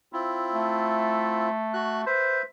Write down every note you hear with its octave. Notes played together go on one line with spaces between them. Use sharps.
C4 E4 F4
A3
F#4 F#6
B4 C5 E5